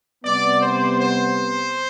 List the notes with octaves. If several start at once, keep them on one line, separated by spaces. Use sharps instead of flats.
C3 G3 B3 D5
C5
C5